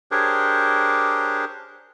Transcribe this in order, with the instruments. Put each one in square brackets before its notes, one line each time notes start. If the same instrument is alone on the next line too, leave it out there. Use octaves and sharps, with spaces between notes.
[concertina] D4 G4 G#4 A#4 C5 C#5